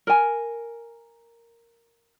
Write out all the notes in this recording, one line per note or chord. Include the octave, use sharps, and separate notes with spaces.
A#4 G#5